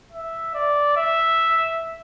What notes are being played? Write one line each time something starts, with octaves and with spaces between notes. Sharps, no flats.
E5
D5
E5